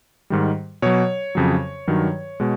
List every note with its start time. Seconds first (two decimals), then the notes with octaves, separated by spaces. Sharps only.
0.30 G#2 D#3 G3
0.82 B2 F#3 C#5
1.35 F2 C#3 F#3
1.87 G2 D#3 F#3
2.40 B2 G#3